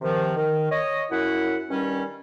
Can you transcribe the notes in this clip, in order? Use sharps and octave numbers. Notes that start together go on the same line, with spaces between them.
C3 D#3 F3
D#3
C#5 D#5
F#2 E4 F#5
G2 D#3 G3 C#4